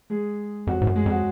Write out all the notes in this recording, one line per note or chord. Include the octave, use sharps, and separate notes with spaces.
G#3 G#4
F2 F#3 F#4
G#2
F#2
G#3 G#4
F2 F#3 F#4